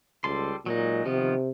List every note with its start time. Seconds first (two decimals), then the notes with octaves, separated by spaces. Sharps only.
0.24 C#2 G3 A4 C6
0.66 A#2 F#3 G#3 D#4
1.05 C3 D#3 F3 B3